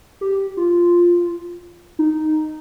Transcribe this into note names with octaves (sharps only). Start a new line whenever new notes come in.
G4
F4
D#4